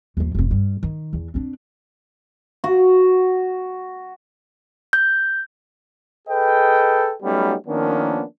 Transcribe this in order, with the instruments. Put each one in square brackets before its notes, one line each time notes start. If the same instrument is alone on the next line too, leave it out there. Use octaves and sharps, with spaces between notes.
[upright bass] D#2 F3
F1 C3
G2
D#3
E2
C4 D4
[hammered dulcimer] F#4
[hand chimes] G6
[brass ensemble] G#4 A4 B4 D#5 G5
F#3 G3 A3 B3 C#4 D#4
D#3 F3 A#3 B3 C#4 D4